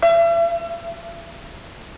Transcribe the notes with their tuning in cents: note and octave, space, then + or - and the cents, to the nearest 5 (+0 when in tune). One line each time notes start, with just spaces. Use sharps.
E5 +40